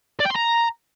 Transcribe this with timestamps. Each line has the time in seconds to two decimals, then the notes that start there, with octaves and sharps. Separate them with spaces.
0.20 D5
0.25 G5
0.30 C6
0.35 A#5